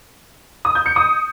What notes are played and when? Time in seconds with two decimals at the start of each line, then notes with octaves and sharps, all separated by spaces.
0.65 D#6
0.75 G6
0.86 C#7
0.96 D#6